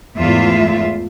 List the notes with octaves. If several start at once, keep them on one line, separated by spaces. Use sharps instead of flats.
E2 G#2 A3 F4 E5